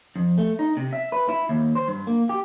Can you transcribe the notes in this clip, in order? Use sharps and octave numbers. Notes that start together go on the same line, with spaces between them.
F2
A3
D#4
C3
E5
B4
E4
D#2
C5
G2
A#3
G4